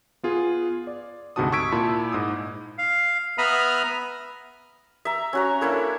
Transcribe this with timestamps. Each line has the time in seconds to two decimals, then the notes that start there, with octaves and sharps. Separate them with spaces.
0.23 B3 F4 G#4
0.87 D5
1.36 D2 G#2 C3 F#4 A5 D#6
1.52 C#6 D#6 E6 G#6 B6 D7
1.72 A#2 E4 A5 B5 C6
2.12 G#2 D#6
2.78 F5
3.38 B3 E5 A#5 B5 D#6 F6
5.05 E5 A#5
5.33 C#4 F#4 A#5
5.61 A#3 D4 E4 A4